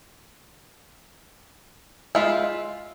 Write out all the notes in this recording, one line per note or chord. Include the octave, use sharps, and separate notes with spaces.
G#3 F4 E5